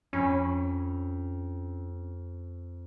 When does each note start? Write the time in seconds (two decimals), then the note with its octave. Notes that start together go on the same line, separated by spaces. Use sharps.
0.13 F2 C#4 B5